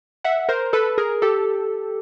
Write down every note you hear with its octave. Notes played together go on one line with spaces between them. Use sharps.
E5 F#5
A#4 C5
A4 B4
G#4 A#4
G4 A4